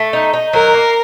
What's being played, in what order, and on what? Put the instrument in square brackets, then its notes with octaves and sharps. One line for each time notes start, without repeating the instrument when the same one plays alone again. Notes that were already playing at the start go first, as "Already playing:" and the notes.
Already playing: [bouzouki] A3
D#4
D#4
[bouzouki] F#3 [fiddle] A#4
[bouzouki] A#3